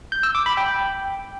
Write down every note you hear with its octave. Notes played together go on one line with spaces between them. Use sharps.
G6
E6
D6
B5
G5